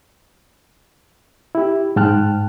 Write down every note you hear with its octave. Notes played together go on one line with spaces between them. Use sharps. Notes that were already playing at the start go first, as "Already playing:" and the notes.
E4 G4
G#2 G#3 G5 A5 F6 F#6